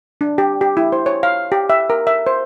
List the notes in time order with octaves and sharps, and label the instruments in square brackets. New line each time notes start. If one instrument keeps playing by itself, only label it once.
[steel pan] D4
G4
G4
E4
C5
C#5
F5
G4
E5
A#4
E5
C5